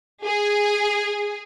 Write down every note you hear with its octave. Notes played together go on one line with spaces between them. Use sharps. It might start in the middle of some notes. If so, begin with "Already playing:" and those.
G#4